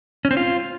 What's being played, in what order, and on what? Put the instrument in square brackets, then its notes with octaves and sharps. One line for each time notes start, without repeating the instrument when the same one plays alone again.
[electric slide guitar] C#4
C4
F4